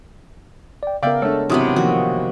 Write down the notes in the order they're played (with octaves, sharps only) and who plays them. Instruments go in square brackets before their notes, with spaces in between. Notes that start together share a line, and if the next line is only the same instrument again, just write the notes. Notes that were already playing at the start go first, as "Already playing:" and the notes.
[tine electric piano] D5 G5
[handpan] C#3 B3 A#4 [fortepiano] D5 E5 G5 [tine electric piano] F5
[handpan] G#3 D4 [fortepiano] A3 A4 [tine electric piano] C#5
[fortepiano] G#1 E3 D#6 [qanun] C3 F#3 B3
[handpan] D#3 F3 A#3 [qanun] F#4